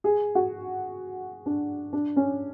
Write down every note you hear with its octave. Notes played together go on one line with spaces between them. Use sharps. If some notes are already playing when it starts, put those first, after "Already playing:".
G#4
F#4
D4
D4
C#4